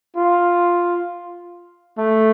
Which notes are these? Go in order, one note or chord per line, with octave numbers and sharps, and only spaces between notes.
F4
A3